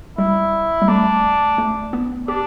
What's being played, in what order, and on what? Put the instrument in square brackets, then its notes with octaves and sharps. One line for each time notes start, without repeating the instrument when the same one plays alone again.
[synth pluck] G3 [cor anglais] E4
[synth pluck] G3
[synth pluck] A3 [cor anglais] D4
[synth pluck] A3
B3
[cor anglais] D4 [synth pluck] G4